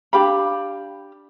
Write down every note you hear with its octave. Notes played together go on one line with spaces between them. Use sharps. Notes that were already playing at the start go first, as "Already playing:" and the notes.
D4 G4 F5 B5